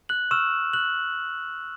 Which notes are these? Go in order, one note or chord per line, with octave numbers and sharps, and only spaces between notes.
F#6 F#7
C#6 E6 F6 E7
F#6 F#7